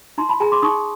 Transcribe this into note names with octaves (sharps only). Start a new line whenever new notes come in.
D#4 A#5 C6
A5 B5
G#4 G#5 A#5
C6 D6
D#4 C#6 D#6